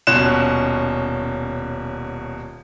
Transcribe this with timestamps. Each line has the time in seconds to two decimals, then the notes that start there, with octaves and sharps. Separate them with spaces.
0.07 D#1 B2 C#4 C6 F#6 E7